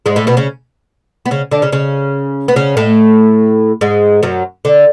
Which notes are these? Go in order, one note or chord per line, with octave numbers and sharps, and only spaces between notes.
G#2 G#3
A2 A3
B2 B3
C#3 C#4
B3
C#3 C#4
D3 D4
C#3 C#4
C#3 C#4
B3
C#3 C#4
A2 A3
G#2 G#3
F#2 F#3
D3